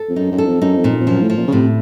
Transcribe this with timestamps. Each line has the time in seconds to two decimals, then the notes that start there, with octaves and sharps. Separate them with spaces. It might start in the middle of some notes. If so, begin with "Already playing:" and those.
Already playing: A4
0.09 F2
0.16 F#2 D#4
0.31 F#2
0.38 A4
0.46 F2
0.62 F#2 D#4
0.77 F2
0.84 A#2
1.01 F2
1.07 F#2 F3
1.22 A2
1.30 F3
1.37 A#2
1.47 C#3
1.52 A2 C3